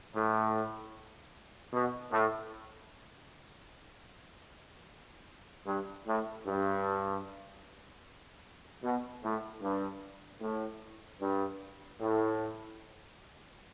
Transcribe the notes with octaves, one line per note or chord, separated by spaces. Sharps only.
A2
B2
A2
G2
A2
G2
B2
A2
G2
A2
G2
A2